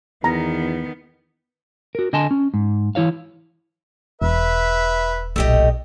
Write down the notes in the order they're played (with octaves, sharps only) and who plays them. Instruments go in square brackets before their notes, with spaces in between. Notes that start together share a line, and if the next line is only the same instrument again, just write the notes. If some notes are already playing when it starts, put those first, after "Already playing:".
[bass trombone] E2 [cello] D#3 B3 [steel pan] A#5
[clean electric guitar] F#4 A#4
D3 D#5 G#5 A5 C6
C#4
G#2
E3 E4 C#5 F5
[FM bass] E1 [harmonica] B4 E5
[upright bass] B1 A#2 [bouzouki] A3 G4 D#5